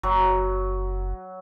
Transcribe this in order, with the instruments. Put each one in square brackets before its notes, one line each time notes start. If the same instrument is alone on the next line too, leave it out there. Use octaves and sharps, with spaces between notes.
[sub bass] F#1 [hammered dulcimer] F#3